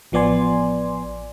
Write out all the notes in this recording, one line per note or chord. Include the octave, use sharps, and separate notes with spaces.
A1 F3 B3 D5 G#5 C6